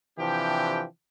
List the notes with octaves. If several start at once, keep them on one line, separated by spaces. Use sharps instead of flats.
C3 E3 F3 D4 G4 G5